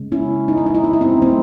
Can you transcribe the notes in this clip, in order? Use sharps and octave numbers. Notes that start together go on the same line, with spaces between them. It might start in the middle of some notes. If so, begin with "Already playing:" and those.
Already playing: C#3 G#3
C#4 E4
D#4
E4
D#4
E4
D#4
E4
C4 D#4
C#3 F#3 A3 C4 D#4